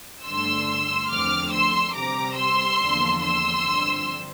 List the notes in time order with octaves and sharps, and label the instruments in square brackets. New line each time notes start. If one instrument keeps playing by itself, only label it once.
[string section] G2 D3 A3 D4 C6 E6
E2 D3 F3 A3 C4 D6 F6
C6 E6
C3 G3 C4 A#5 D6
C6 E6
E2 D3 F3 A#3 D4
C6 E6
G2 D3 F3 C4